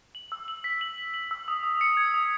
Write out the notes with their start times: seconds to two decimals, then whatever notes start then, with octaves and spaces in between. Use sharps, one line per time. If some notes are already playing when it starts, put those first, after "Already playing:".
0.15 F#7
0.32 E6
0.48 F#7
0.64 B6
0.81 F#7
0.98 F#7
1.14 F#7
1.31 E6
1.48 D#6
1.63 D#6
1.81 C#7
1.97 G#6
2.14 D#6